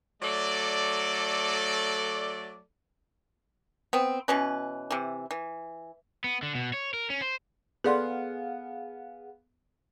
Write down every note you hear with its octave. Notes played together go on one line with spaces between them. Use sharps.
F#3 A3 A4 D5
B3 C4
B2 E3 C#4 B4
C3 E3
E3
B3
D3
B2
C#5
A#4
C#4
C5
B3 G#4 A4 D5 F5 F#5 C6